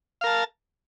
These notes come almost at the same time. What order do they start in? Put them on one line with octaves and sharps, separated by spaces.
F5 A#4 A5